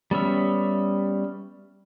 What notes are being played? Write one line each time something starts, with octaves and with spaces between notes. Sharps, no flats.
G3 B3 C#4 E5